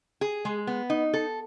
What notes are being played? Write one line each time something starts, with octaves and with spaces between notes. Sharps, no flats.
G#4
G#3
B3
D#4
A4